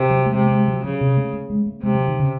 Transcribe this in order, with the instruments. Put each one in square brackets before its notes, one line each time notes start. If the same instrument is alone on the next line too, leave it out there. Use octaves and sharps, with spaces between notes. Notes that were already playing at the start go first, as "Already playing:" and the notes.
Already playing: [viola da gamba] C3
[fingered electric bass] F#3
A3
[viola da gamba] C3 [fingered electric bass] G#3
[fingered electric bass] A3
G#3
F#3
[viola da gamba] C#3 [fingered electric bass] F#3
[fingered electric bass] C3
A3
A3
G#3
A3
[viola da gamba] C3 [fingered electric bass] G#3
[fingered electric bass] F#3
D#3
C#3